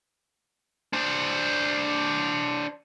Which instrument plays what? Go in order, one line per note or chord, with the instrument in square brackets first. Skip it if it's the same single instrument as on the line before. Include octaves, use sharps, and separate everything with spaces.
[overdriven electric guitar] D4 C5